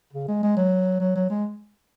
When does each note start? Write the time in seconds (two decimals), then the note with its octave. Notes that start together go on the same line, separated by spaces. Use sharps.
0.13 C#3
0.28 G#3
0.43 G#3
0.57 F#3
1.00 F#3
1.15 F#3
1.30 G#3